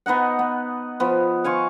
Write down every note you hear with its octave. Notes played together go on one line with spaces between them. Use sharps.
B3 D#4 D#5 F#5
B3
F3 B3
F5 G#5 C6 C#6